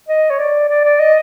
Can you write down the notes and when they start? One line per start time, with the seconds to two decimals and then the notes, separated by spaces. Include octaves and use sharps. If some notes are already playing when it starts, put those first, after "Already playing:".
0.08 D#5
0.30 C#5
0.39 D5
0.69 D5
0.84 D5
1.00 D#5